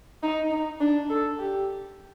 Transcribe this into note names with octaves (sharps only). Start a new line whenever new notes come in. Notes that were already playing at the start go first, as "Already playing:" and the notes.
D#4
D#4
D4
A4
G4